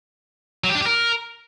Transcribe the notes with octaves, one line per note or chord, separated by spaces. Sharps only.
F#3
G4
D4
G4
A#4